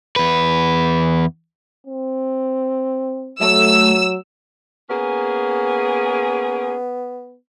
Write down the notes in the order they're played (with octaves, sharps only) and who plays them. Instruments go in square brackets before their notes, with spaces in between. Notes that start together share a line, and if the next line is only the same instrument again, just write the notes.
[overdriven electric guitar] E2 B4
[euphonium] C4
[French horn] F#3 [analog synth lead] A3 [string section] E6
[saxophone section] A#3 C#4 G#4 [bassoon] B3